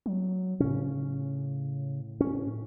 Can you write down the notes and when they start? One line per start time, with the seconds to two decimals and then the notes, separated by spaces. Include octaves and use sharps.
0.06 F#3
0.60 A2 C#3 C#4
2.20 C#4